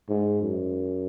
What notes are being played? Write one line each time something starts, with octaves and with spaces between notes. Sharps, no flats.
G#2
F#2